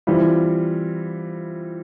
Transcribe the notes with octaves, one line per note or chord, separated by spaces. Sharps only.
E3 G3 C4 F4